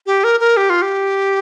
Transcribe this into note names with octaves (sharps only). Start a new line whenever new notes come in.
G4
A#4
A#4
G4
F4
G4